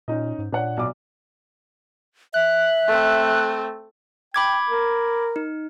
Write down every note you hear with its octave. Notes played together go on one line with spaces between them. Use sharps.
A#2 C#4 D#4 D#5
G#2
A#2 D4 C#5 F#5
B1 D5 D6
E5 F#6
A3 C4
G5 B5 D6 G#6
A#4
D#4